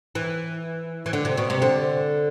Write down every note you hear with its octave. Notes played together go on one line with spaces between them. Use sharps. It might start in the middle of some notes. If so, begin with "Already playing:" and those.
E3
E3
D3
C3
B2
C3
D3